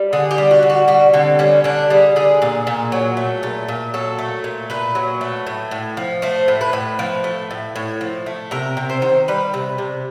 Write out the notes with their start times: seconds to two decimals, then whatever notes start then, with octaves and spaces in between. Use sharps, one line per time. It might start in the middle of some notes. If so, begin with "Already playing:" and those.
Already playing: G3
0.13 D3 G#4
0.31 G4
0.38 G3
0.51 F#4
0.63 D3
0.70 F#4
0.88 G3 F#4
1.14 D3 C4
1.39 G3 C#4
1.64 D3 D4
1.90 G3 G#4
2.16 D3 G#4
2.42 A#2
2.67 A#2
2.92 F#3
3.17 A3
3.43 A#2
3.68 A#2
3.94 F#3 A4
4.19 A3
4.44 A#2
4.70 A#2 B4
4.95 F#3
5.21 A3
5.47 A2
5.71 A2
5.97 F3
6.22 A3 C5
6.48 A2
6.61 B4
6.73 A2
6.99 F3
7.24 A3
7.51 A2
7.76 A2
8.01 F3
8.26 A3
8.51 C3 A#4
8.77 C3
8.90 C5
9.02 D#3
9.28 G3 B4
9.54 C3
9.78 C3